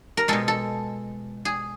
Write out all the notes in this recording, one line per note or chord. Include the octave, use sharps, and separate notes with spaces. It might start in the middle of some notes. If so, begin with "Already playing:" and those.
A#4
B2 G#3 A4
A4
G#4